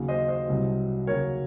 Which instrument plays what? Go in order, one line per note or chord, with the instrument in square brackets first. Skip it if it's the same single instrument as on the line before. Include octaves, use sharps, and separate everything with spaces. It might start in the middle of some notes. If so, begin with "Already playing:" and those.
Already playing: [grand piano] D#2 C#3 F#3
C5 D#5
C5 D#5
C2 C3 F#3
D#2 C#3 F#3 A#4 C#5